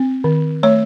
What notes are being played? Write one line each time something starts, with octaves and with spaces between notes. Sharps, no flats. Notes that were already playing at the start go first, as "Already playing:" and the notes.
Already playing: C4
D#3
A3 C#5